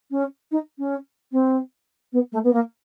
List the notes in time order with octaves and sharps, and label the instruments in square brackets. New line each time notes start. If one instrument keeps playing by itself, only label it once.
[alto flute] C#4
D#4
C#4
C4
B3
A3
B3
A#3